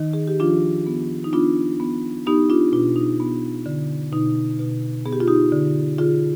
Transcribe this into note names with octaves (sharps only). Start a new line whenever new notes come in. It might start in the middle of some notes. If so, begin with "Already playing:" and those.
Already playing: D#3 D#4
G#4
G4
F3 D4 F4
B3
D#4
B3 D4 F4
B3
B3 D#4 G4
D4 F4
B2 D4 F4
D#4
B3
D3
B2 D#4
B2
B3 G#4
G4
F4
D#4 G4
D3
D3 F4 G#4